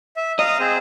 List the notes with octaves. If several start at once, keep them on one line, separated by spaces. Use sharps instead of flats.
E5
D#5 F5 A#5 D#6
C4 G#4 C5